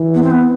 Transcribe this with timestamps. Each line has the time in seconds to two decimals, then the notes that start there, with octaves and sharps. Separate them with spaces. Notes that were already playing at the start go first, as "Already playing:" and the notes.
Already playing: E3
0.15 B3
0.22 C4
0.31 B3